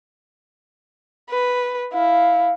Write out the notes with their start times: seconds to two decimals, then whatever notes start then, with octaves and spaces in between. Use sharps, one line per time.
1.30 B4
1.93 E4 F5